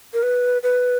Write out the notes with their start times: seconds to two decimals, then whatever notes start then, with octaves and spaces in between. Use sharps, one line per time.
0.14 A#4
0.23 B4
0.63 B4